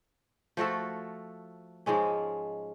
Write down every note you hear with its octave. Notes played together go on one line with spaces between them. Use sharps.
F3 A3 F#4 A4
G#2 F3 G#3 C#4